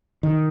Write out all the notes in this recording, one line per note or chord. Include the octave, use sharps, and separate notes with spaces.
D#3